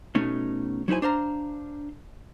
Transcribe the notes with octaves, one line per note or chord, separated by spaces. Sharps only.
B2 A3 C#4 D#4
F#3 D#4 E4 C5 G#5
D4 C5 F5 A#5